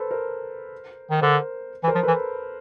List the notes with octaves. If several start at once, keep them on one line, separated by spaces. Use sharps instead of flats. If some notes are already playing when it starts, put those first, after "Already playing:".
Already playing: A4 B4 C5
A#4 C5
D#3
D3 A#4 C5
E3
A#4 C5
F3
E3 A4 B4